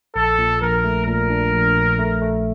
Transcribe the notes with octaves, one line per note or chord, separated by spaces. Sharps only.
A#1 A4
A#2
A#1 A#4
A3
A#2 A#4
D4
A#1
A#1
A3
A3